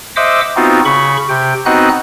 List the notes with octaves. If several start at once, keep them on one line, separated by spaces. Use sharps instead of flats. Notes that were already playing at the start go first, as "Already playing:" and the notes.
C5 D#5 E5 F#5 D6 E6
B3 C4 D#4 F4 F#4
C#3 B5 C#6
C3 G5
B3 C4 D#4 F#4 D#5 F#6